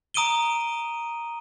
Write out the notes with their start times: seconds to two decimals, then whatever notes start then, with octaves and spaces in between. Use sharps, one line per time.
0.14 A#5 D#6 D7 D#7 G7